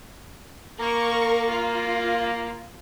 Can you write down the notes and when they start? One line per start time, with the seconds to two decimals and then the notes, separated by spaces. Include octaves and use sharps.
0.79 A#3 A#4 C#6
1.50 F4